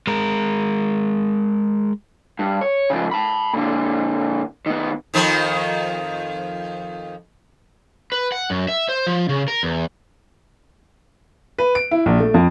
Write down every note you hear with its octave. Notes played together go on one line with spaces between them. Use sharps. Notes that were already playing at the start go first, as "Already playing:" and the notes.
G#3 A#4
G2
C#5
C#3 F3
A5 B5
A#2 D3
D#3 B3
F2 D#3 F3
B4
F#5
F#2
E5
C5
F3
C#3
A#4
E2
B4
D7
E4
A#1
A3
F2